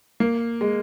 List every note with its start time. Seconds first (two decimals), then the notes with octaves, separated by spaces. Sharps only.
0.20 A#3
0.61 G#3